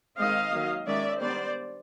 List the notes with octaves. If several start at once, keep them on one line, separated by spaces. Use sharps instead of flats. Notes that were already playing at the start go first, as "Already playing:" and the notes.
D#3 G#3 C4 D#5 F5
D#3 F#3 A#3
D#3 G#3 C#4 D5 E5
D#3 G3 B3 D4 C5 D5